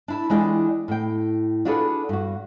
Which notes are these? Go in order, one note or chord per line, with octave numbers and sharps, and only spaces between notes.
D4 E4 A5
E3 G#3 D4 F4 G5
A2 G5
D4 F4 F#4 G#4 A4 B4
G2 F#4